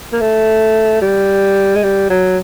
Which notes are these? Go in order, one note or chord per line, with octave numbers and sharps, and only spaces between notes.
A#3
A3
G3
G#3
G3
F#3